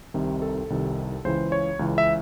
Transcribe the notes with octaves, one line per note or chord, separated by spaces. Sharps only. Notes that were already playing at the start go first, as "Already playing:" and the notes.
C2 C3 D#3
A4
C2 C3 D#3
C#2 C#3 E3 C5
C#5
C#2 C#3 E3
E5